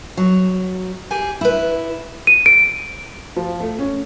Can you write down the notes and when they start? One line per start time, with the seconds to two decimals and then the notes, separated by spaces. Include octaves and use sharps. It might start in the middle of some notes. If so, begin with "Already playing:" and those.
0.17 F#3
1.11 G4 G#4 G#5
1.41 E4 B4
2.27 D#7
2.46 D7
3.36 F3
3.60 A3
3.79 C#4